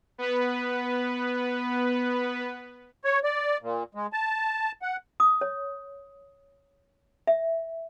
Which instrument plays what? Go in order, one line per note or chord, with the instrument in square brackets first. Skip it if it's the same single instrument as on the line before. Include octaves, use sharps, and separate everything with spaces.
[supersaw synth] B3 B4
[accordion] C#5
D5
A#2
G#3
A5
F#5
[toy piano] D#6
C#5
E5